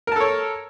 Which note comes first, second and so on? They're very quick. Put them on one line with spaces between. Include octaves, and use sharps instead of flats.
A#4 A5 A4 C#5